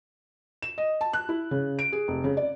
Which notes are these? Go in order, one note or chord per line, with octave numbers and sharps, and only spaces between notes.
E7
D#5
A5
F#6
E4
C#3
D7
G#4
F1
C#3
D5